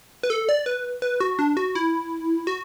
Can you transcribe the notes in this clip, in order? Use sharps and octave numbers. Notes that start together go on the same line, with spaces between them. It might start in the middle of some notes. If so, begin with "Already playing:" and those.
B4
A4
D5
B4
B4
F#4
D4
F#4
E4
F#4